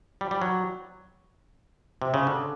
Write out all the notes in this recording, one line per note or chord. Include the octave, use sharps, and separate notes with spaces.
G3
G3
F#3
C3
C#3
D3